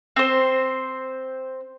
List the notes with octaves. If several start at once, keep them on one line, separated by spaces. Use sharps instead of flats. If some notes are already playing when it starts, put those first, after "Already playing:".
C4 C5